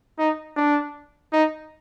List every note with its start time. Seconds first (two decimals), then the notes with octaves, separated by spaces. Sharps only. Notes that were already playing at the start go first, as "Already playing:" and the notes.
0.19 D#4
0.56 D4
1.33 D#4